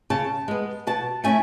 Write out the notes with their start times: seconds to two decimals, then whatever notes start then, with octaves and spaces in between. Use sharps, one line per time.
0.10 C#3 A5
0.48 G#3 B3
0.87 B2 A5
1.24 A3 C#4 E4 G#5